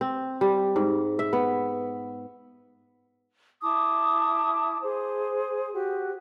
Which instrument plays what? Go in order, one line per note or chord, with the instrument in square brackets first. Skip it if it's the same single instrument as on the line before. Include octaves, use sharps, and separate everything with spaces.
[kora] C4
G3
G#2
E5
B3
[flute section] E4 A5 D6 D#6
G#4 C5
F#4 G4